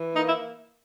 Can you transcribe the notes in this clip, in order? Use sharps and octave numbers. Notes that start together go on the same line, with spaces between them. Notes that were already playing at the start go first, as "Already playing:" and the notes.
Already playing: E3
A#3 D#4
E4